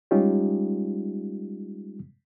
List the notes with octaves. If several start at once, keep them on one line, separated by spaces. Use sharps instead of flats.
G3 G#3 C#4 D#4 F4 G4